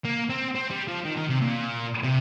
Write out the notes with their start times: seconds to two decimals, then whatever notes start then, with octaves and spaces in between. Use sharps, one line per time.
0.05 A#3
0.29 C4
0.55 C4
0.71 G3
0.88 F3
1.05 D#3
1.17 D#3
1.29 C3
1.41 A#2
2.03 C3